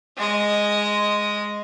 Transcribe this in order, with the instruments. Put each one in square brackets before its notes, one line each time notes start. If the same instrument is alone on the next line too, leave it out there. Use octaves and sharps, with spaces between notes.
[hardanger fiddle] G#3 D#5